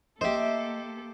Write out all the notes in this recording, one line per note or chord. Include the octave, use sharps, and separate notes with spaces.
A#3 G4 A4 C5 D#5 E5